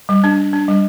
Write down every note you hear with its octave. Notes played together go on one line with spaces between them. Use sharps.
G3
D4
D4
D4
G3